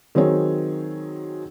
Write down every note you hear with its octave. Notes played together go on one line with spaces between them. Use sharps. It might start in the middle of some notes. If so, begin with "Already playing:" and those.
D#3 F#3 C4 G#4 C#5